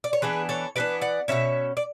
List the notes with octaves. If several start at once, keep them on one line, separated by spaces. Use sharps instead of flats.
D5
C#5
E3 B3 D4 G#4 B4
A4 C#5
E3 B3 D4 B4 D5
D5 F#5
B2 F#3 C#4 C#5 E5
D5